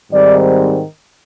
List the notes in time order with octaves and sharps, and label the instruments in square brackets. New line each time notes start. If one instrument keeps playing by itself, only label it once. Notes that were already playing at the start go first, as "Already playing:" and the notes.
[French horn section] G#2 D#3 G3 C4 D5